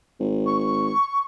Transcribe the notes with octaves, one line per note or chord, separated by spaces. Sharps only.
G#1
C#6